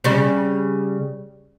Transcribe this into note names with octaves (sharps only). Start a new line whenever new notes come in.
C#3 G3